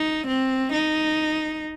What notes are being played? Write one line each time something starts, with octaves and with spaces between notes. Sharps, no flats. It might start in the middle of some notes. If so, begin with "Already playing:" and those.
Already playing: D#4
C4
D#4